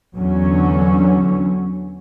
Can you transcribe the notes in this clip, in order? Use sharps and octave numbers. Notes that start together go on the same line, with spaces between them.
E2 D3 F#3 C#4